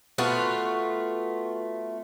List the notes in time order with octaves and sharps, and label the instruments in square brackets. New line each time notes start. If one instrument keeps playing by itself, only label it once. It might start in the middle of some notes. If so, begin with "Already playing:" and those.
[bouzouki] A3 B3 F4 F#4